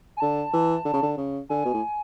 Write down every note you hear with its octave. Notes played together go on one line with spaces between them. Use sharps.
G#5
D3 A5
E3
D3
C#3
D3
C#3
D3 G#5
B2
A2